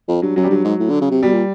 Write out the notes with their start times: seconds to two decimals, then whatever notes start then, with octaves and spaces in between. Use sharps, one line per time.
0.09 F2
0.22 G2 F#3
0.36 F#2 F#3
0.44 G3
0.50 G2 F#3
0.65 G#2
0.80 A2
0.90 D3
1.01 C#3
1.11 C3
1.22 B2 G3
1.32 A#2